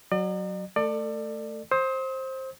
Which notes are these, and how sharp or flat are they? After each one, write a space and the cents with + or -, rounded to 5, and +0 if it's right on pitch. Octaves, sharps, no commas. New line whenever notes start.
F#3 +5 D5 +45
A3 +0 A4 +35 D5 +25
C5 +15 D#6 +45